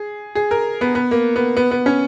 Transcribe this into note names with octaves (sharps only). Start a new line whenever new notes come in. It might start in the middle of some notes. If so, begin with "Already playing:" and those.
Already playing: G#4
G#4
A#4
B3
B3
A#3
B3
B3
B3
C#4